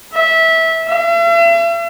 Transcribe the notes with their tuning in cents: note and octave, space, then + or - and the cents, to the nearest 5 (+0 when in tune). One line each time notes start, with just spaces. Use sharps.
E5 -20
E5 +45